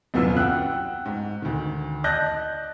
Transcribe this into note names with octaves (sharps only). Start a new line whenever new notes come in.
D#1 C2 F#2 B3 F4 E6
F#5 G5 E6 F#6
G#2
D2 D#3
D5 D#5 A5 F#6 G6 A#6